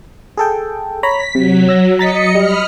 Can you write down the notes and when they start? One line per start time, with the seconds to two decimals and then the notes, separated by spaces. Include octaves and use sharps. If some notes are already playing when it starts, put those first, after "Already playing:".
0.37 G#4 A4 G5
1.03 C#5 A#5 B5 B6
1.35 C3 F#3
1.69 E6 A#6
1.99 D#5 A#5 A6 B6 C#7
2.35 G3 B5 D#6 F6